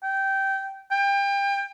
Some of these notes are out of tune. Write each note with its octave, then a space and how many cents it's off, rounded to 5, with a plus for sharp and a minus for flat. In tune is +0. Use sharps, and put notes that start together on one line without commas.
G5 -15
G5 +30